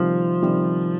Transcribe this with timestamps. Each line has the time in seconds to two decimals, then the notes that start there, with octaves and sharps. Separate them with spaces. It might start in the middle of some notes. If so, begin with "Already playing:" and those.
Already playing: C3 D#3 F3 G3
0.42 C3 D#3 G3